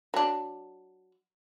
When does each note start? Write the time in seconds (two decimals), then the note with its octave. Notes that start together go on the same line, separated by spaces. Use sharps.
0.14 F#3 D4